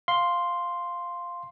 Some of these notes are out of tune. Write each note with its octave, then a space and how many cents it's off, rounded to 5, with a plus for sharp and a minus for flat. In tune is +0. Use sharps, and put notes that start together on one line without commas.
F5 +0 C6 +0